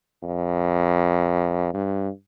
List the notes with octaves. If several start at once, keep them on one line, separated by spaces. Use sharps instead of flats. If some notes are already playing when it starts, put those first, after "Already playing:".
F2
G2